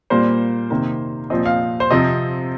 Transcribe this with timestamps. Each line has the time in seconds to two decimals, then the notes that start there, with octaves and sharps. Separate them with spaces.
0.10 A#2 G3 A#3 C5
0.71 C3 D#3 A#3
1.30 A#2 F3 C4 D#5
1.46 F5
1.80 C5
1.91 C3 F3 C4 D#5